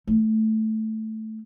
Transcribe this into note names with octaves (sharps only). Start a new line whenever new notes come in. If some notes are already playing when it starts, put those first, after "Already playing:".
A3